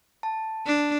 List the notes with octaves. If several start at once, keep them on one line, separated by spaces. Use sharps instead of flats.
A5
D4